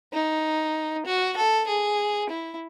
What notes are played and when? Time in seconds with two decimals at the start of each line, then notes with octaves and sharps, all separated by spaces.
0.13 D#4
1.06 F#4
1.37 A4
1.67 G#4
2.29 E4